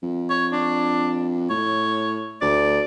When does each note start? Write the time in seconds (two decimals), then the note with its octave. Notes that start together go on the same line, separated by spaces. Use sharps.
0.03 F2
0.30 C#5
0.52 D4
1.50 A2 C#5
2.42 D2 D5